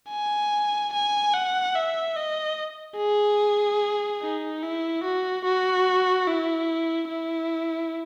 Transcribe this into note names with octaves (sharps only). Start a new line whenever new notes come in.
G#5
G#5
F#5
E5
D#5
G#4
D#4
E4
F#4
F#4
E4
E4